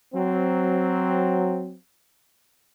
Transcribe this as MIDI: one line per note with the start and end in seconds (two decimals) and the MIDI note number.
0.14 1.73 54
0.14 1.73 60